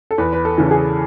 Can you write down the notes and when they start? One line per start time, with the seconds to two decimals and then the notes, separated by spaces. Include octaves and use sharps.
0.11 A4
0.18 E2 B4
0.33 B4
0.45 A4
0.58 C#3 E3
0.71 G#4